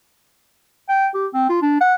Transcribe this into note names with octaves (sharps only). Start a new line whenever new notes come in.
G5
G4
C4
F4
D4
F#5